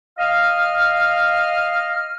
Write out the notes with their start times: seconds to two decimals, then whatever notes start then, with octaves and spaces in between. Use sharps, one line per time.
0.18 D#5 F5 F6